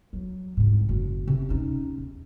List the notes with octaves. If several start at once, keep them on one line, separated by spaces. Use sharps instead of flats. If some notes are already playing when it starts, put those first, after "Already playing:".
F#3
C2 G#2
F#1
C3
C#4 D#4
E2